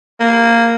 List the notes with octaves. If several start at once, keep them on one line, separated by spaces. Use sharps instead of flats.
A#3